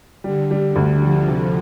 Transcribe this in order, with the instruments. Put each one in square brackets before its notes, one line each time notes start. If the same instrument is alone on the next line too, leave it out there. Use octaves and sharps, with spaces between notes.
[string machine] D3 [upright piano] G3
[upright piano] G3
D2
[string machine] D3 F3 [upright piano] G3
[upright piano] C3